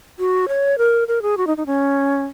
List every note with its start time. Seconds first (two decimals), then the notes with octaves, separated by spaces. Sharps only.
0.19 F#4
0.48 C#5
0.78 A#4
1.08 A#4
1.22 G#4
1.37 F#4
1.47 D#4
1.57 D#4
1.66 C#4